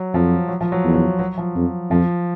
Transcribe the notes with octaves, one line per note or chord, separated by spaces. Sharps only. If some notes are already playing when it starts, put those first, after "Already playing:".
Already playing: F#3
F2 F3
F#3
F3
F#3
E2
F#3
F#3
F3
F2
F2 F3